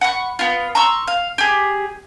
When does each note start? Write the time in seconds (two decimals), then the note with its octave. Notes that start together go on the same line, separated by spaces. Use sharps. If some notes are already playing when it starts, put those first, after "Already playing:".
0.01 F#5 B5 C#6
0.39 B3 F4
0.75 A#5 C6 C#6 E6
1.07 F5
1.38 G4 G#4